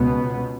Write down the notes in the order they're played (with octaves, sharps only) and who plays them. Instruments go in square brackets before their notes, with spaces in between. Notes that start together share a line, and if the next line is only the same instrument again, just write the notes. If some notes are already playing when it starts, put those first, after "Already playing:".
Already playing: [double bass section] C#2 B2 B3